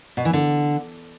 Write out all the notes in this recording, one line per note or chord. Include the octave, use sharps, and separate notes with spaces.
B2
E3
D3